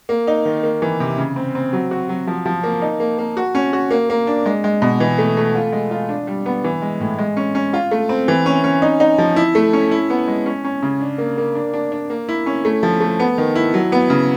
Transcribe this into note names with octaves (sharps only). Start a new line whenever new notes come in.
A#3
D#4
D#3
A#3
E3
C3
C#3
C4
C4
F#3
F#4
F#3
F3
F3
A#3
D#4
A#3
A#3
F#4
C#4
F#4
A#3
A#3
D4
G#3
G#3
B2
E3
A3
A3
F4
G#3
F4
D4
G3
B3
E3
G#3
A2
G#3
C#4
C#4
F4
A3
C4
E3
C#4
C#4
D#4
D#4
F3
E4
A3
C#4
E4
B3
G#3
C#4
C#4
C#3
D4
A#3
A#3
D4
D4
D4
A#3
E4
C#4
A3
F3
A3
B3
D#3
E4
F#3
B3
C#3